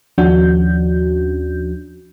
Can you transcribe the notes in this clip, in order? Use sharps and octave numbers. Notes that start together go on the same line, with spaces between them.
D#2 F3 C#4 D4 F#4 G6